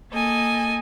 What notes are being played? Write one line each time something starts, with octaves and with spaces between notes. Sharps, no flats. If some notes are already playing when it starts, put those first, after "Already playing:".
A#3 A4 D#5 G#5